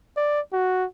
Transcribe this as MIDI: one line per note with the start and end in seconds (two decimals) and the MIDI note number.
0.17 0.40 74
0.53 0.85 66